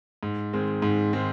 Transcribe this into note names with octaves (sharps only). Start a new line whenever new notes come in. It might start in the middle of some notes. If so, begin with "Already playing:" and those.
G#2
D#3 G#3 C4
G#2
D#3 G#3 C4